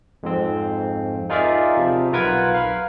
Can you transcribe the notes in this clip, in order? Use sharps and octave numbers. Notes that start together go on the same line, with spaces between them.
F2 G#2 C4
D#4 F4 G#4 A#4 D5 E5
C3 F3
B1 F4 A#4 B4 F#5 G#6
F5 B5